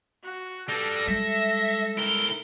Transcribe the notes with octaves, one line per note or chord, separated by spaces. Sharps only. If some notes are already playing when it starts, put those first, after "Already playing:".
F#4
G3 D4 A4 A#6
G3 G#3 E5
E4 A#4 G7